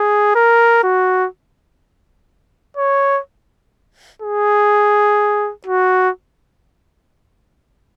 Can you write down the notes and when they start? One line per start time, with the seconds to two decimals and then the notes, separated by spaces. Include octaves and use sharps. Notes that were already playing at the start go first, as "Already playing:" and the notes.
Already playing: G#4
0.35 A#4
0.83 F#4
2.77 C#5
4.22 G#4
5.66 F#4